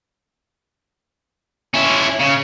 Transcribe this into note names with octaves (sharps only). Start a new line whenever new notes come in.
C#4 E4
C#3